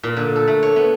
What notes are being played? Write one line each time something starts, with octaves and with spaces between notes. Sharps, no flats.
A#2
D3
A4
A3
C#5
B3